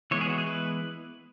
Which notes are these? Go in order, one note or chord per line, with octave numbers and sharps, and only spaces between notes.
E3 G#3 B3 E4 C#5
G#4
F#4
G#4
B4